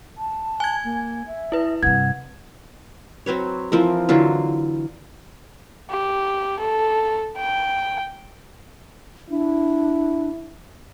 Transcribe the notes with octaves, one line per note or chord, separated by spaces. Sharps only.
A5
G#5 G#6
A#3
E5
E4 B4
G2 C3 F#5 G#6
F#3 C4 B4 C#5
E3 F3 C4 A#4
D3 E3 F#3 F4
G4
A4
G5
D4 E4